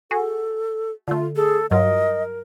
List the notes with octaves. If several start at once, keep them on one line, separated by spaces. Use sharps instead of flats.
F#4 G#4 A4
D3 A3 F4
G#4 A4
G2 F#3 F4 A#4 D#5